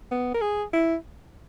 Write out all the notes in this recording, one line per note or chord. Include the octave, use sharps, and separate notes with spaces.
B3
A#4
G#4
E4